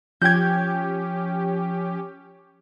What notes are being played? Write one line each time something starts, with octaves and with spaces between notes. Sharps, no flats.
F3 C#4 G4 G5 G6 G#6